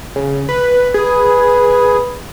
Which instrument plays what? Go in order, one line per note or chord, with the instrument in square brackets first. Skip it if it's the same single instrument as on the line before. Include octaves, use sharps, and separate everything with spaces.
[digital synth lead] C#3
B4
[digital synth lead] G#4 [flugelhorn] B4